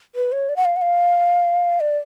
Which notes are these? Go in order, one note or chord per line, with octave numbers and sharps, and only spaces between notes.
B4
C#5
D5
F#5
F5
F#5
F5
D5